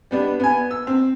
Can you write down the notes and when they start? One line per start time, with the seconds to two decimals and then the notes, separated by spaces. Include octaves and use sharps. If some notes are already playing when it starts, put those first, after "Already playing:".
0.11 G3 B3 D4
0.40 B3 G#5
0.71 E6
0.87 C4